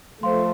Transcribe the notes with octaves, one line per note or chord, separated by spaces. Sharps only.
F3 A3 C5 F5 C6